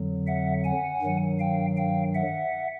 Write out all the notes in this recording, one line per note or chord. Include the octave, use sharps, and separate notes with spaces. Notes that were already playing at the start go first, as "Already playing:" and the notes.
Already playing: F2 D3 F#3
E5 F#5
F#5 G#5
G2 D#3 F#3
F5 G5
F5 G5
E5 F#5